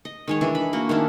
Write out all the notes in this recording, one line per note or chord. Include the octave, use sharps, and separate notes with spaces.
D#5
D#3 G#3 C#5
E3 D4 G#4
B5
A#3 F#4
D#3 C#4 D4 E4